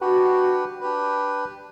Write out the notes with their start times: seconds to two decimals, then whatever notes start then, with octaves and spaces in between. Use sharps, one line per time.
0.01 D4 F#4 G4 B4
0.81 D4 G4 B4